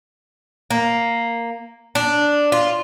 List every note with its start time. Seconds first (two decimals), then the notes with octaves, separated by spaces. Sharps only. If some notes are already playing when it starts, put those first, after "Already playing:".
0.71 A#3
1.95 D4
2.52 F4